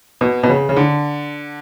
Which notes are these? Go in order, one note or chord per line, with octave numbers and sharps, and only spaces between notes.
B2
B2
C#3
C#3
D3